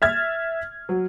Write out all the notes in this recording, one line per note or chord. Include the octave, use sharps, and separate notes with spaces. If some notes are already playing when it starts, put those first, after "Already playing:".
E5 F6 G#6 A6
F#3